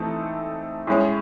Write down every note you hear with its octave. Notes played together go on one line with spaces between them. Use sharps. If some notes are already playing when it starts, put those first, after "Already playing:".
Already playing: E3 A3 C4 D#4 A4
A2 G#3 C#4